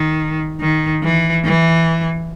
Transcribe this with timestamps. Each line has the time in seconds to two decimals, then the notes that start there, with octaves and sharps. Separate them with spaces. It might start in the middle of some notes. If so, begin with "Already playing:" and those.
Already playing: D#3
0.61 D#3
1.03 E3
1.45 E3